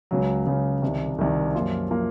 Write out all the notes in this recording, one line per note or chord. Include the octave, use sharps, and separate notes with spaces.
C#2 C#3 F#3
C#2 C#3 F#3
C2 C3 D#3
C2 C3 D#3
F#2 F3 A#3 F4
F3 A#3 F4